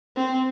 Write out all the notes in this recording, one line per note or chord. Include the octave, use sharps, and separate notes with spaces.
C4